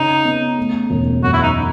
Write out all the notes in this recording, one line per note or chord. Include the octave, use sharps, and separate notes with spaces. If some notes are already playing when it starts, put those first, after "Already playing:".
Already playing: C#3 D#4
B3
A3
E1
F#2 F#4
E4
D#4